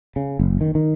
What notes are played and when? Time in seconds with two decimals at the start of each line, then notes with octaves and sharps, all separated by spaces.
0.16 C#3
0.39 F#1
0.61 D#3
0.75 D#3